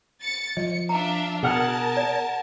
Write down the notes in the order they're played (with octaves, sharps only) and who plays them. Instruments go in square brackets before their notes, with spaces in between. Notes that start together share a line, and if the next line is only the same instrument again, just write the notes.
[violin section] A6 C#7
[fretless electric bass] F3 [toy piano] D#5 [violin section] C#7
[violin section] D4 E5 F5 [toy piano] A#5
[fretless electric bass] B2 [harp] G#4 F#5 F6 [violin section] A#4 A5
[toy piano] D5